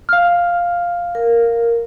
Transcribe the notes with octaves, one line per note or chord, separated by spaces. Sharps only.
F5 F6
A#4